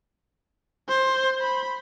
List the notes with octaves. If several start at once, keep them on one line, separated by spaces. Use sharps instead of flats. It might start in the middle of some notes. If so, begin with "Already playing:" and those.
C5
B5